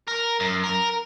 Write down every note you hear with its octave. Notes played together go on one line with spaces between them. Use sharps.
A#4
F#2
A#4